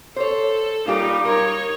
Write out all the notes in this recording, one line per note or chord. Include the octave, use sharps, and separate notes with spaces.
A4 C5 C#5
G3 A#3 D#4 F4 G4
D#4 A#4 C#5